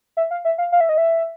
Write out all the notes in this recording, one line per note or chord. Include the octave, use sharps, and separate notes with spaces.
E5
F5
E5
F5
F5
E5
D#5
E5